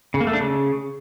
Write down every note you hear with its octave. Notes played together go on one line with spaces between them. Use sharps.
C#3
A#3
A3
D4
C#3